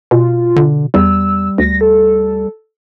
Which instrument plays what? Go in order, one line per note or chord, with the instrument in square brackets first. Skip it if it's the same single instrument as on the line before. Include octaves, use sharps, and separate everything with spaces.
[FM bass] B2 [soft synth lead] F4
[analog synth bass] D3
[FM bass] E2 [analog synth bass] G3 [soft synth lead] E6
[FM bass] D2 [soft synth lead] A#6
[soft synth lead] A4